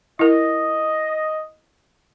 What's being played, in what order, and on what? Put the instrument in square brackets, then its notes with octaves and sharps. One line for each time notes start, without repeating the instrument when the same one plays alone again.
[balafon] E4 A#4 [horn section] D#5